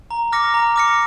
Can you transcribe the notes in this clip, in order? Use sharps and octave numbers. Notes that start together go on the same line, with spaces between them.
A#5
D6 F6 A#6 C#7
A#5
D6 F6 A#6 C#7